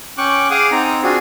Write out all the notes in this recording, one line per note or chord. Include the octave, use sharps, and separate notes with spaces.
C#4 G5 C#6 D6 F#6
G#4 F5 F#5 D6 D#6
C4 D#4 A#5
C4 D4 F4 F#4 G#4